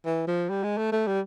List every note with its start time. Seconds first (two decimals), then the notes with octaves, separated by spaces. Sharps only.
0.05 E3
0.27 F3
0.50 G3
0.63 G#3
0.77 A3
0.92 A3
1.07 G3